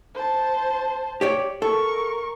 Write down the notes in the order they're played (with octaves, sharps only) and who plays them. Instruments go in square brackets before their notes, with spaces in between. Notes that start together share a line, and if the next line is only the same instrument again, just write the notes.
[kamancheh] C5 A5
[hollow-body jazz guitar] G4 C#5 D5
[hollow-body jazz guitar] A4 [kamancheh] A#4 C#6